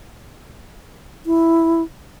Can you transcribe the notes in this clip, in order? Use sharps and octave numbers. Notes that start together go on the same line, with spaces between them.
E4